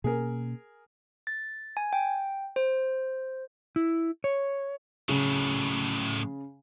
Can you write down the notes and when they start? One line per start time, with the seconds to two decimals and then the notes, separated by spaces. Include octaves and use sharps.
0.04 B2 A#3 C#4 G#4 A#4
1.27 A6
1.77 G#5
1.93 G5
2.56 C5
3.76 E4
4.24 C#5
5.09 A2 C#3 F#3